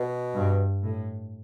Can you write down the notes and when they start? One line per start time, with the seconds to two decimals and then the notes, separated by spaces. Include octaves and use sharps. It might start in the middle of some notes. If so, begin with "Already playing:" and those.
Already playing: B2
0.35 G2
0.83 A2